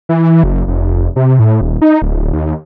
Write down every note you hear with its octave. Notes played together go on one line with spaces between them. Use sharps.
E3
F#1
F1
C3
A2
D#1
D#4
D1
D#2